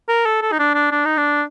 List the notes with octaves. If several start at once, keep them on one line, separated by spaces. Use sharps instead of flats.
A#4
A4
A4
D#4
D4
D4
D4
D#4
D4